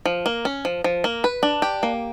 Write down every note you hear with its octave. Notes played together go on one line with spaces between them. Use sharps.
F3
A#3
C#4
F3
F3
A#3
B4
D4
G4
A#3